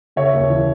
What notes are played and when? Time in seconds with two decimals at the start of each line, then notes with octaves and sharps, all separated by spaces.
0.16 C#3 C#5 E5
0.33 D#2
0.50 E3